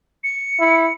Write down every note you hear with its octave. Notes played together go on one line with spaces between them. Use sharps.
C#7
E4